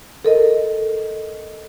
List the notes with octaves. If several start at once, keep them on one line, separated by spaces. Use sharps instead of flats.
A4 A#4 D#5